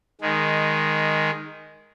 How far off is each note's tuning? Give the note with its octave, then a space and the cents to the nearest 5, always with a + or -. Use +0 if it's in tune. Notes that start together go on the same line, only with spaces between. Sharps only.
D#3 -5 G#3 +0